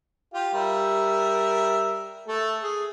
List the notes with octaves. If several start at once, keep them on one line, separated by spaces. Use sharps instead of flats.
F4 G4
G3 A#4 E5
A3 A4
G#4